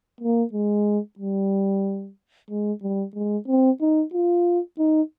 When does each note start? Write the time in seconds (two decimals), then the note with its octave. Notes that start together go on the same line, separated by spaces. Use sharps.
0.20 A#3
0.53 G#3
1.19 G3
2.50 G#3
2.82 G3
3.15 G#3
3.48 C4
3.81 D#4
4.14 F4
4.79 D#4